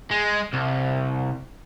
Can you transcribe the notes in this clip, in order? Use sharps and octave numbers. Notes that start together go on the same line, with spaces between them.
G#3
C2